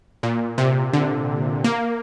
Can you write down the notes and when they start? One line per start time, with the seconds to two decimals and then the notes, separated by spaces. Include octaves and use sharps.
0.23 A#2
0.58 C3
0.93 D3
1.64 A#3